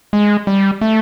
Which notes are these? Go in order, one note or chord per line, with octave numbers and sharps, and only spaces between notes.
G#3
G3
A3